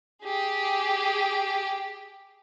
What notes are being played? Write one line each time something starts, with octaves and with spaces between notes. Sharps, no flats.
G4 G#4